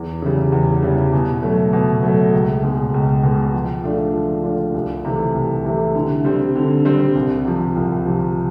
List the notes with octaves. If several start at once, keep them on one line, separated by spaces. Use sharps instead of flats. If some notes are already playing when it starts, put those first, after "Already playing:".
Already playing: E2
C#3 E3 G3
E2
C#3 E3 G3
B2
F#3 A3
B2
F#3 A3
C#2
B2 G#3
C#2
B2 G#3
F3
A3 D4 F4
F3
A3 D4 F4
C2
C3 E3 A3
C2
C3 E3 A3
D3
G3 C4
D3
G3 C4
C2
C3 F3
C2
C3 F3